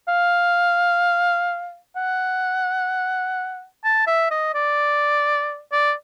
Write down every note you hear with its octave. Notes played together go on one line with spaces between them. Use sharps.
F5
F#5
A5
E5
D#5
D5
D5